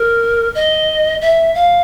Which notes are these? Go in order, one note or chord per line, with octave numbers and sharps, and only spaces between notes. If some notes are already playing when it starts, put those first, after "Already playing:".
Already playing: A#4
D#5
E5
F5